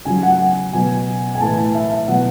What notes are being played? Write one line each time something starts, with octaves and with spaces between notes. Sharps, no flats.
C#3 F#3 G#5
F#5
F#5
B2 F#3 G#5
G#5
A2 E3 A5
A5
E5
E5
B2 F#3 F#5